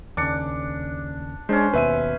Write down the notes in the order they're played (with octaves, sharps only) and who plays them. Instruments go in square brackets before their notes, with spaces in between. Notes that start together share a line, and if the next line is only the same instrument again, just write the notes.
[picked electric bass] D#2 C#3 [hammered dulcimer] D4 [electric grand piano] D6 C#7
[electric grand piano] G#3 D4 [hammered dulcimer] C#4 C5
[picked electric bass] D#2 B2 [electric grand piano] B4 E5 D#7